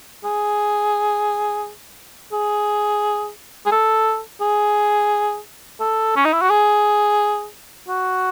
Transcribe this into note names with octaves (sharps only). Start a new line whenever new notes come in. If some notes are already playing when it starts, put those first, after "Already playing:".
G#4
G#4
G#4
A4
G#4
A4
C#4
D#4
E4
F#4
G#4
F#4